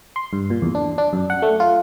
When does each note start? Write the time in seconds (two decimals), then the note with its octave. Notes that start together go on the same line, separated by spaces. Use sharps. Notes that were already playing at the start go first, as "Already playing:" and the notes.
0.16 C6
0.33 G2
0.50 A#2
0.62 E2
0.75 D4
0.98 D4
1.13 F#2
1.30 F#5
1.42 A3
1.60 F4